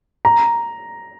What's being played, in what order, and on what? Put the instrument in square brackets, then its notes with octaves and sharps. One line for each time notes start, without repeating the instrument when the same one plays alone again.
[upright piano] A#5